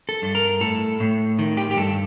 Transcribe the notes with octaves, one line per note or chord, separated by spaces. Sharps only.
A4
G2
A#4
A2 A4
A2
D#3
G4
G4
G2 A4